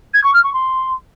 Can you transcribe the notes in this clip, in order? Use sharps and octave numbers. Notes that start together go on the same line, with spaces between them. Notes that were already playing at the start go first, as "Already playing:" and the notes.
G#6
C#6
F6
C#6
C6